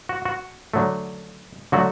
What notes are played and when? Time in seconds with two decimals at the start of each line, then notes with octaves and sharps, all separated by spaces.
0.09 F#4
0.25 F#4
0.74 D3 F#3 A3
1.72 D3 F#3 A3 F#4